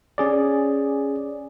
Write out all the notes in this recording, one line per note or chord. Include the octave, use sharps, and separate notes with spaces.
C#4 G#4 D5